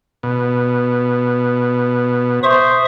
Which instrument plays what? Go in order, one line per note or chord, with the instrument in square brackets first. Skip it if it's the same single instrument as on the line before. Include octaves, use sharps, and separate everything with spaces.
[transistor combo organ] B2
[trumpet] C5 [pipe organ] E5 C#6 D#6